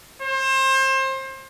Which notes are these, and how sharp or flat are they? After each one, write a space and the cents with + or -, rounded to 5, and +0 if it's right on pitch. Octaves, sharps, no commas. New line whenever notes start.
C5 +30